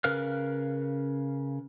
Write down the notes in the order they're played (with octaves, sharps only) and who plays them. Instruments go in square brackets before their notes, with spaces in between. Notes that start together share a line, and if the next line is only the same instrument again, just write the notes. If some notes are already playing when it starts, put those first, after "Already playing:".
[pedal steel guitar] C#3 A#4 B4 F5 F6